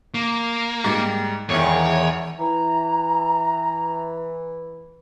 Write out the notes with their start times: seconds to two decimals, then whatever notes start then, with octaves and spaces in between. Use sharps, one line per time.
0.14 A#3
0.84 G#2 G3
1.50 E1 E2 D#3 C#5
2.39 E3 A#5